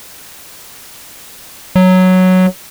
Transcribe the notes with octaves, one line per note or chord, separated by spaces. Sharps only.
F#3